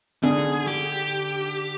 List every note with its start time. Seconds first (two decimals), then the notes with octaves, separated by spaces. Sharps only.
0.23 D3 G#4
0.67 G4